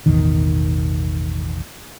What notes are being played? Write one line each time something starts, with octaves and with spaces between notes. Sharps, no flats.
A1 E2 B2 D#3